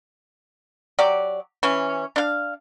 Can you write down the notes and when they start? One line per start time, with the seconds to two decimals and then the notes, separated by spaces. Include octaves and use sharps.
0.99 F#3 G4 D5
1.63 E3 C#4
2.16 D4 F5